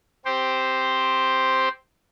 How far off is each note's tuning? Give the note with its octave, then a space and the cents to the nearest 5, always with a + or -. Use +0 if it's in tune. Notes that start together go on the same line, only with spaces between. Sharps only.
C4 +0 G4 +0 C5 +0